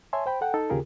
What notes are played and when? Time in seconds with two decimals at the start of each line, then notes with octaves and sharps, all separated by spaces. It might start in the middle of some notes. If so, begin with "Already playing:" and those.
0.13 C#5 E5 G#5 A5 C6
0.26 C5 G5 B5
0.41 A4 F#5 G5
0.54 D#4 A4
0.70 D#2 C#3 F4 G4 G#4 A#4